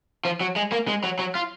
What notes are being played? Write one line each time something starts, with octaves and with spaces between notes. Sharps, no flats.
F3
F#3
G#3
A#3
G#3
F#3
F#3
F4